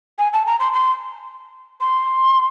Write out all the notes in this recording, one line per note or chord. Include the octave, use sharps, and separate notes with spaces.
G#5
A5
A#5
C6
C6
C6